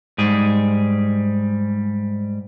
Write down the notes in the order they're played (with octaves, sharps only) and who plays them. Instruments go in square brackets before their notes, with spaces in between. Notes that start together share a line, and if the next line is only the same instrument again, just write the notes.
[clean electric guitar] G#2 G3 G#4